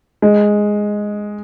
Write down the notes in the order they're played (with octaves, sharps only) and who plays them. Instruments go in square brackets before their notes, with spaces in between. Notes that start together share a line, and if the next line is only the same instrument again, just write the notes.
[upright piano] G#3